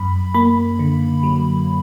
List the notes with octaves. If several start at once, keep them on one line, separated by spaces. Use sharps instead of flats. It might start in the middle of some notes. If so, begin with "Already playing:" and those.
Already playing: F#2 B5
A#3 B5
D3
F#3